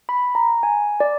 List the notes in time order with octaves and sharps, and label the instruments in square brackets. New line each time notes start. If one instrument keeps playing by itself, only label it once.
[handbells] B5
A#5
G#5
D5